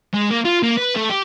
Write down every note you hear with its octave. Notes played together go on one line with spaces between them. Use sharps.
G#3
A#3
F4
A#3
B4
A3
G4